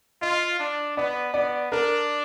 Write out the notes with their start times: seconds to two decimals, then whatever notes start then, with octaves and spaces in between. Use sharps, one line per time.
0.22 F4 D#5
0.60 D4
0.97 B3 D5
1.34 B3 D5
1.72 D4 A#4